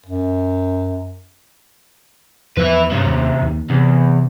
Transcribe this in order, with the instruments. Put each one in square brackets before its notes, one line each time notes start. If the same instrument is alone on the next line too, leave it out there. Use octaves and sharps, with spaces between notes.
[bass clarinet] F#2
[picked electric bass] E2 F3 [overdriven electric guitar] B4 E5
[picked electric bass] G2 [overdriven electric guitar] C3 C#4
[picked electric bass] D#2
D#2
[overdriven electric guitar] E2 [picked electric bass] C3